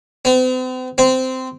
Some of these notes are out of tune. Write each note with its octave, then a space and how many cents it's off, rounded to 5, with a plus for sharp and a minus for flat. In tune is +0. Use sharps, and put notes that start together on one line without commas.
C4 -45
C4 -15